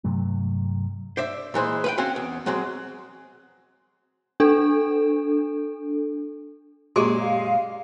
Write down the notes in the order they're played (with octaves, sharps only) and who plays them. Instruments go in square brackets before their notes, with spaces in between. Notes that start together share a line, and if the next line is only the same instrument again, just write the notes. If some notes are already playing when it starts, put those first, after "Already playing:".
[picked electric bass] G2 C3 F#3 A3
[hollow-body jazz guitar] C5 D5 E5
A#2 E3 G#3 C5
B4 F5 G5
C4 C#4 F#4 F5
E2
F#3 G#3 C4
[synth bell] D4 A4
[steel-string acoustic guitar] F#2 A#2 G#3 [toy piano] G4 G#4 C6
[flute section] F5